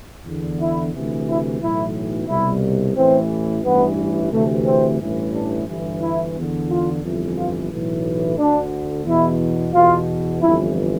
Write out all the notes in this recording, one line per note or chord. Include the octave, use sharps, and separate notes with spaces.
E2 D3
E4
D2 C3 E3
E4
B1 A2 E3 E4
C2 B2 E4
A1 A2 E3 C4
A1 G2 E3 B3
D2 C3 E3 A3
C4
A1 G2 E3
D4
G1 G2 E3
E4
E2 D3
F4
G1 F2 E3
F4
B1 A2 E3
D2 D3 D4
E2 B2 E4
E2 B2 F4
G1 F2 E3 E4